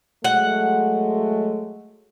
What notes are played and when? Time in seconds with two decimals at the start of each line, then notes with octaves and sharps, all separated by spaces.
0.24 F#3 G#3 A3 F#5